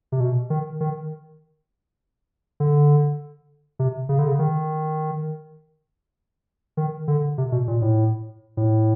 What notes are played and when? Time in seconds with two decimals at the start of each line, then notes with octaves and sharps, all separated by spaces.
0.12 C3
0.20 B2
0.50 D#3
0.80 D#3
2.60 D3
3.79 C3
4.09 C#3
4.19 D3
4.28 C#3
4.39 D#3
6.77 D#3
7.08 D3
7.38 C3
7.52 B2
7.68 A#2
7.82 A2
8.57 A2